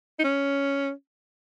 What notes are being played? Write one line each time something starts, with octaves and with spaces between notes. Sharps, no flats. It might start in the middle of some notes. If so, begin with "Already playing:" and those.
D#4
C#4